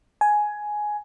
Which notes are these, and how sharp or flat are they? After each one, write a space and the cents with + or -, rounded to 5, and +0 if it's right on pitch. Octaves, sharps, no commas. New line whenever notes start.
G#5 +10